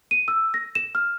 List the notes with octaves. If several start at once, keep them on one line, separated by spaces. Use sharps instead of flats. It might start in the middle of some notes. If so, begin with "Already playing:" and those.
D#7
E6
A#6
E7
F6